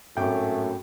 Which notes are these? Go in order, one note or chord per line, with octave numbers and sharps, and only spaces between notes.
G#1 F#2 A2 A3 G5 D6